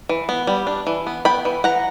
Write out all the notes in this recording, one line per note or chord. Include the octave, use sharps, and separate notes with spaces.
E3
B3
G3
D4
E3
B3
B3 G5 B5
E3
E3 F#5 A#5